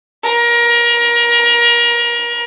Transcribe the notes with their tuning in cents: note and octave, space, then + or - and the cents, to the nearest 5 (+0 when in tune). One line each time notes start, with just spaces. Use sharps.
A#4 +30